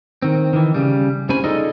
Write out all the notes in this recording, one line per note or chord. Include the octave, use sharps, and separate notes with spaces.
D#3 C4
D#3 E3
C#3 G3
C2 C3 C#4 C5 G#5 B5
D#4 F4 G#4 A4 D5 D#5